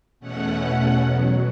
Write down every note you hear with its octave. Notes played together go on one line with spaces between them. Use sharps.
E2 B2 A3 C#4 F#5
E2 B2 F#3